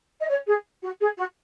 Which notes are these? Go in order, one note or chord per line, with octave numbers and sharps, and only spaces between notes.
D#5
C#5
G#4
F#4
G#4
F#4